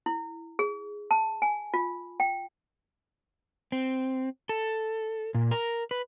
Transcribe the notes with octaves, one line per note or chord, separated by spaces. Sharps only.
E4
G#4
A5
G#5
F4
G5
C4
A4
A#2
A#4
B4